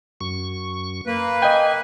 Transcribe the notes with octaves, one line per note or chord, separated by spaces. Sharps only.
F#2 C#6
A#3 B4
D#5 G5 G#5